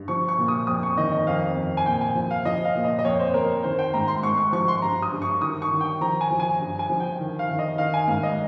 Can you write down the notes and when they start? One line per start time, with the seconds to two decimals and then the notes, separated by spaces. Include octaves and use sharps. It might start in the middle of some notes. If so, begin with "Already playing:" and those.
Already playing: G2
0.08 F3 C#6
0.28 C#6
0.38 A#2
0.48 D#6
0.67 F2 D#6
0.83 C#6
0.98 D#3 D#5
1.12 D#5
1.27 F2 F5
1.56 F2
1.77 G#5
1.86 A#2 G5
2.01 G#5
2.15 F3
2.31 F5
2.45 F3 D#5
2.65 F5
2.75 A#2
2.85 D#5
2.99 D#5
3.05 F2 C#5
3.19 C5
3.34 F2 A#4
3.63 D#3 C5
3.79 G5
3.94 G#2 A#5
4.08 C6
4.23 G#2 C#6
4.38 C#6
4.52 F3 C#6
4.68 C6
4.82 G2 A#5
5.02 D#6
5.12 G2
5.22 C#6
5.41 D#3 D#6
5.62 C#6
5.71 D#3
5.81 G5
6.01 F3 A#5
6.21 G#5
6.30 F3
6.40 G#5
6.60 G2
6.79 G#5
6.90 F3
7.00 G5
7.20 D#3
7.39 F5
7.49 D#3
7.59 D#5
7.78 D#3 F5
7.94 G#5
8.08 G#2 F5
8.23 D#5